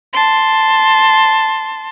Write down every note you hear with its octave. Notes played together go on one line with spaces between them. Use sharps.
A5 C6